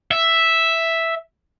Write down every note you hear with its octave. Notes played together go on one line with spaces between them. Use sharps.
E5